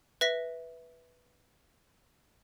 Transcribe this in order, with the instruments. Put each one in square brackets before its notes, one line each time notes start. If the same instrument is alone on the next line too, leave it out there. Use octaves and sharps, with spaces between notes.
[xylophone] B4 E5 A#6 B6